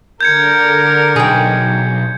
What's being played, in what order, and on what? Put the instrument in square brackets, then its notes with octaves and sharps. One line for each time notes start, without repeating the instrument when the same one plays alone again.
[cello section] D3 A#4 [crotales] G6 G#6 C#7
[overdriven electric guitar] B1 [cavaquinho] G#4 G5